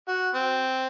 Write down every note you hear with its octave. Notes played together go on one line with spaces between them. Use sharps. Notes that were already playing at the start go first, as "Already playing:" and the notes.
F#4
C4